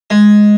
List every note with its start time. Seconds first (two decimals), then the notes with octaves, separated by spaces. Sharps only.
0.10 G#3